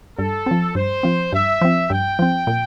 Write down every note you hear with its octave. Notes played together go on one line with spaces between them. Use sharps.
G2 A4
F3 C4
G2 C5
F3 C4
G2 E5
F3 C4
G2 G5
F3 C4
A#2